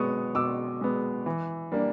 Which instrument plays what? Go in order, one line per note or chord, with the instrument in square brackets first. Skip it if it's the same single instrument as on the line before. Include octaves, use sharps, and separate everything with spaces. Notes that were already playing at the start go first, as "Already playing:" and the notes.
Already playing: [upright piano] B2 G#3 B3 C#6 D#6
B2 D6 E6
G#3 B3
E3
G3 A#3 D4